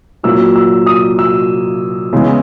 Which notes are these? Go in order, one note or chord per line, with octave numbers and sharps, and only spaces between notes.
A#2 F#3 A#3 E6
E6
D#6
E6
C#3 E3 G#3 B3